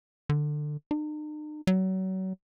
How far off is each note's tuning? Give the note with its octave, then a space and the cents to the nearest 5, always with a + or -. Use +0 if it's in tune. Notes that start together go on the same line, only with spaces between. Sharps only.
D3 +20
D#4 -45
F#3 +30